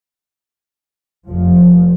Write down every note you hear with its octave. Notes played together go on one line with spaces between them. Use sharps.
F1 F3